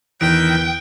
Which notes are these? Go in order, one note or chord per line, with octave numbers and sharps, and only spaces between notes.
E2 D#3 E3 G5 F#6 D7